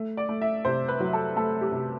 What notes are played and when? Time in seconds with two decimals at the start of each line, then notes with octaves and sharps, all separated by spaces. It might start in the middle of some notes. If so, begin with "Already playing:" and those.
Already playing: A3
0.17 D5
0.29 A3
0.41 E5
0.65 C3 C5
0.88 B4
1.00 F#3
1.13 A4
1.36 A3 A4
1.61 G4
1.72 C3